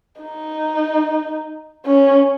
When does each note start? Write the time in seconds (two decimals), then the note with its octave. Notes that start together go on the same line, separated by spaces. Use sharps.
0.21 D#4
1.86 C#4